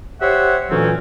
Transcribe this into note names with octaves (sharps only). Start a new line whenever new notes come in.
G4 C5 C#5 E5 F#5
D2 A#2 E3 F#3 C4 C#4